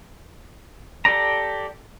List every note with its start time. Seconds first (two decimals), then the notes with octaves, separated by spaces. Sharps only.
1.05 G4 A4 D5 A#5